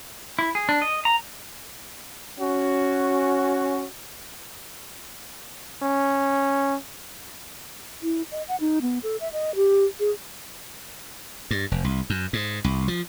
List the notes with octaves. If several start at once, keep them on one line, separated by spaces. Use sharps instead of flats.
E4
G#4
D4
D#5
A#5
C#4 F#4
C#4
E4
D#5
F#5
D#4
B3
A4
E5
D#5
G4
G#4
G2
F1
C2
F#2
G#2
C2
F3